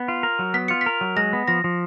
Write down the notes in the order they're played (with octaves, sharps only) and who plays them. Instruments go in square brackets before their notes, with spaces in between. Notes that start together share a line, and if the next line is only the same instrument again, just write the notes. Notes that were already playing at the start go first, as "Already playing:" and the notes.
Already playing: [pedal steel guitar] B3
F4
A#4
F#3
[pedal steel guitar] B3 [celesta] B6
[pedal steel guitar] F4 [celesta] C#7
[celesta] B6
[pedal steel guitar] A#4
F#3
[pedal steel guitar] G#3 [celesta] A#6
[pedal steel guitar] B3
[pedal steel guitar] F3 [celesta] A#6
[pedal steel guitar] F3